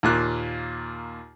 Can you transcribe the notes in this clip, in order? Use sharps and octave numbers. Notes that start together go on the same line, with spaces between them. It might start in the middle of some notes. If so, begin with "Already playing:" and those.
D#2 A#2 F#6